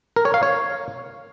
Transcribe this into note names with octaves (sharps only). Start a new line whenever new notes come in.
A#4
C#5
F5
C#5